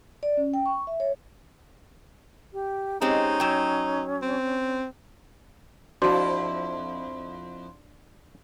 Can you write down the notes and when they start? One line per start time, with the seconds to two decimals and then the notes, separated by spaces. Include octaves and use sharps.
0.23 D5
0.37 C#4
0.54 G5
0.66 C#6
0.87 E5
1.00 C#5
2.53 G4
3.02 G#3 C4 C#4 D#4 G4
3.40 F#3 G5
4.22 C4
6.02 F2 D4 E4 F#4 C5 D5 C6